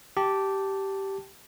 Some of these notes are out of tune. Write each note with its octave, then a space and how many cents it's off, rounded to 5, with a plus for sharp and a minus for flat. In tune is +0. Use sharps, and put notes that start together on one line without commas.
G4 -10 A5 +0